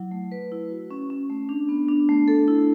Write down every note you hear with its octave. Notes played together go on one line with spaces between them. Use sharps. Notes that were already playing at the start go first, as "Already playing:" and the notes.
Already playing: F#3 E4
A3
B4
E4
F#4
C#4
C#4
A3
D4
B3
D4
A3
A4
E4